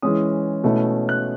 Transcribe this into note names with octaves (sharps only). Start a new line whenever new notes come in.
E3 G#3 C#4 D#6
B2 A3 C#4 E4
F#6